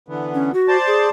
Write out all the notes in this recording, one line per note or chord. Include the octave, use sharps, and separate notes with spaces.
D3 E3 B3
C#4
F#4
C5 D5 A5
G#4